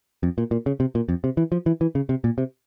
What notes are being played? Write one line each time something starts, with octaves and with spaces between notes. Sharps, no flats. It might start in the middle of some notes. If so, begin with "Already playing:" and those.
F2
A#2
A#2
C#3
C3
A#2
F2
C3
E3
F3
E3
E3
C#3
C3
A#2
C3